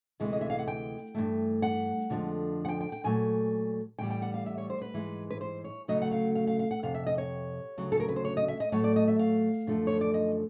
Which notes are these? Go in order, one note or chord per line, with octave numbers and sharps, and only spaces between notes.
D2 C3 E3 G#3
D#5
E5
F5
F#5
G5
G2 E3 A3
F#5
F2 D3 F3 G#3
F#5
G5
G5
G5
A#2 F#3 A3 G#5
A2 E3 G3 G5
G5
F#5
F5
E5
C#5
C5
B4
G#2 E3 G#3
B4
C5
C#5
D2 C#3 F#3 A3 D#5
F#5
F5
F5
F5
F5
F#5
F2 C3 F5
E5
D#5
C#5
D2 C#3 F#3
A4
A#4
B4
C5
C#5
D#5
E5
D#5
A2 F#3 A3 C#5
D5
D#5
E5
F5
F#2 D3 F3 A3
C#5
D5
D#5